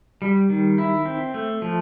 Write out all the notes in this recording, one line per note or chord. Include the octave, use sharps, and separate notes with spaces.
G3
D#3
E4
C4
A3
F3